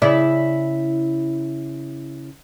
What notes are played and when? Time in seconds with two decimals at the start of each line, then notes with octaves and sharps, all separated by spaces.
0.02 C#3 E4 D5